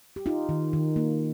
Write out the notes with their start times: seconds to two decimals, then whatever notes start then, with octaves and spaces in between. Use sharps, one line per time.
0.16 G4
0.26 D#4 F4
0.49 D#3
0.73 D#3
0.96 A#3